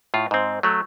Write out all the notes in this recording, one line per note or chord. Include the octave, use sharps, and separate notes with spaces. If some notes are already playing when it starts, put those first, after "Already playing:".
A2 F4
G#2 C4
F#3 A3